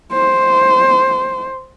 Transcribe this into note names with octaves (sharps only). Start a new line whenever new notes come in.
C5